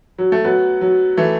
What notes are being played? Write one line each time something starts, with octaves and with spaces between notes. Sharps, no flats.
F#3
A3
F#3 B3
F#3
E3 A3